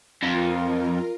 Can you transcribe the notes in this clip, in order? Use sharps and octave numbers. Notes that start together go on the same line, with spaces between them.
F2 F4 A#4